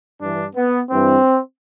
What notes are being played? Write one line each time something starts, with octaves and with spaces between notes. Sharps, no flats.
G2 E3 D4
B3
G2 E3 C4